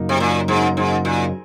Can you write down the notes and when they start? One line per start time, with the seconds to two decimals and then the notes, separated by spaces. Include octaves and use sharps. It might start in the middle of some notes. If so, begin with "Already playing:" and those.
Already playing: F#2 C#3 F#3 A#3 D#4
0.09 C3
0.20 A#2
0.48 G#2
0.77 G#2
1.05 A#2